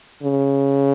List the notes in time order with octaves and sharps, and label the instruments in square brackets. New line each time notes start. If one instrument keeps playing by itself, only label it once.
[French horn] C#3